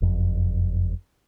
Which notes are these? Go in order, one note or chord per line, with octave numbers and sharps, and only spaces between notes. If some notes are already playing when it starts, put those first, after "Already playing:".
F#1 F2